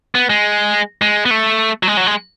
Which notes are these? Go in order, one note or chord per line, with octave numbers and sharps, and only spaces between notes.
B3
G#3
G#3
B3
A3
F#3
G#3
F#3
G#3